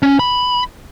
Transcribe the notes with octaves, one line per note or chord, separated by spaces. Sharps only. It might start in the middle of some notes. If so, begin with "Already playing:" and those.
C#4
B5